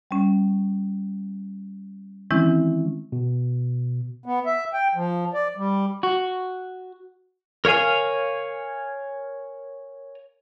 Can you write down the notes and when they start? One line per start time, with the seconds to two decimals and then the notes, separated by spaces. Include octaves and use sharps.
0.11 G3 C#4
2.31 D#3 E3 G#3 C4 C#4 E4
3.12 B2
4.26 B3
4.46 E5
4.73 G5
4.95 F3
5.34 D5
5.57 G3
6.03 F#4
7.65 A#4 C#5 F5 G#5